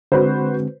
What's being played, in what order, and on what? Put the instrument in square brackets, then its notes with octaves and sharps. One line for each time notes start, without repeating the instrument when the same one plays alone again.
[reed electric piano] D3 G#3 C4 [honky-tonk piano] F#4 B4 C5